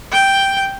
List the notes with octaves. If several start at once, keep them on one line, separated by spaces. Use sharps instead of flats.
G5